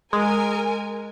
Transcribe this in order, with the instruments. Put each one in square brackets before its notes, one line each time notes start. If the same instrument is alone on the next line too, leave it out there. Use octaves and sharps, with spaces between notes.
[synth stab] G#3 [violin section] A#4 G#5